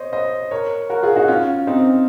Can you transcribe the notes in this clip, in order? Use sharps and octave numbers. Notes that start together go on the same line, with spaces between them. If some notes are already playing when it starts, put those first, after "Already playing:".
Already playing: C5 C#5 D#5
C5 D#5
A#4 C#5
F#4 A#4
F4 G#4
D#4 F#4
C#4 F4
C4 D#4